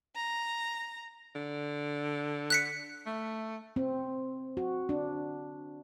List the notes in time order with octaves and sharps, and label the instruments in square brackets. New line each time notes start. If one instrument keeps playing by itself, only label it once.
[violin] A#5
[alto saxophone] D3
[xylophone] F#6 B6 C#7
[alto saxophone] A3
[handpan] C4
F#4
D4